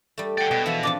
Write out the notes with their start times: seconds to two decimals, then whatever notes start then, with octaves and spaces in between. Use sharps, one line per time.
0.18 G3 A3
0.38 D5 F#5 G5
0.51 B2 G#4
0.66 E3 F3 E5
0.83 F3 C4 D4 D6